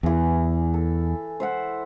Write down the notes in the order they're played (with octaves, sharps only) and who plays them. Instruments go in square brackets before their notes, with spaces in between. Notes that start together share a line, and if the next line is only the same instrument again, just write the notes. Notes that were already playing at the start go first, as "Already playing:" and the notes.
[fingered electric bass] E2 [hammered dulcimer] E3 G#4
[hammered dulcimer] A4
C5 E5 F#5